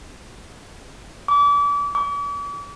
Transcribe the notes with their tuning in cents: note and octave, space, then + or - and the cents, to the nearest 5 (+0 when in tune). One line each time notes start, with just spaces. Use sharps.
D6 -35
D6 -45